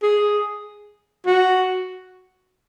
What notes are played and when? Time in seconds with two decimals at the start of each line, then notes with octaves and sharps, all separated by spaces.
0.03 G#4
1.26 F#4